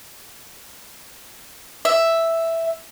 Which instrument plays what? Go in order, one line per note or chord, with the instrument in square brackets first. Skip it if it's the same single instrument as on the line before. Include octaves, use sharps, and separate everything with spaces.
[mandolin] E5